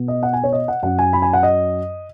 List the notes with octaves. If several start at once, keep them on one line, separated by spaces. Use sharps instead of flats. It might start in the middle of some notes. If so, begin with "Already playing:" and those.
Already playing: B2 B3
D#5
F#5
G#5
C#5
D#5
F#5
F#2 F#3 C#4 F#5
G#5
B5
G#5
F#5
D#5